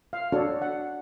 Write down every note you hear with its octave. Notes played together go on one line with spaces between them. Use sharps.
F5
D4 F#4 A4 C#5
F#5